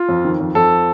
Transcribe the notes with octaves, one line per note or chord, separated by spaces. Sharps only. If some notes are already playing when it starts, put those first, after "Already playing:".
Already playing: F4
F2
D#3
F2
F2 A4